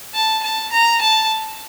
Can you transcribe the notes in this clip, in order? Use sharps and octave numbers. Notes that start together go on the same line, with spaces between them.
A5
A5
A#5
A5